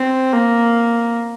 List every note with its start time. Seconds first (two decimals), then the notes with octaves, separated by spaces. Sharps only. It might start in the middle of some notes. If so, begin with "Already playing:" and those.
Already playing: C4
0.33 A#3